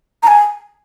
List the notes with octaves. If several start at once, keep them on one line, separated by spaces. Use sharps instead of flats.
A#5
G#5